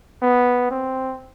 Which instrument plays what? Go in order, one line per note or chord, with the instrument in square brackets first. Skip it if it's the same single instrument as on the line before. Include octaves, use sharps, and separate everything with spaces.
[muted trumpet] B3
C4